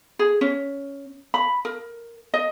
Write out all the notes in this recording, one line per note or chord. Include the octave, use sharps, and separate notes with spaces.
G#4
C#4
B5
A#4
D#5